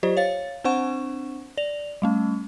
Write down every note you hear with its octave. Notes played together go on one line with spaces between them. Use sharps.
F#3 F4 G4 C5 D#5
C#5 F5 A6
C4 D4 C5 F#5 C#6 E7
D5 F7
G3 A3 C#4